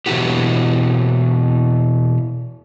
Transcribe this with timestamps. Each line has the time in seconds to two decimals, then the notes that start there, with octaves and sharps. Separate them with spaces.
0.06 B2 E3 A3 E4 F#4 G4